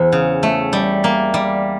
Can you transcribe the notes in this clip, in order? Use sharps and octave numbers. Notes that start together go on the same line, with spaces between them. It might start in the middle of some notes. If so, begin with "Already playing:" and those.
Already playing: E2 C5
C#3
A3
G3
A#3
G3